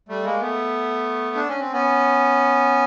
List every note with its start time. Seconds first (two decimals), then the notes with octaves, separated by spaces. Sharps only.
0.08 G3 A3
0.24 G#3 A#3
0.40 A3 B3
1.36 D4
1.48 C#4
1.60 C4
1.73 B3 C#4